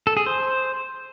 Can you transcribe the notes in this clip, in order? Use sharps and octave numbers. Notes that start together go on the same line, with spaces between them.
A4
G#4
C5